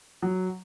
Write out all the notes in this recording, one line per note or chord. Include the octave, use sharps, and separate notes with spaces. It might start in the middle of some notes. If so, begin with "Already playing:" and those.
F#3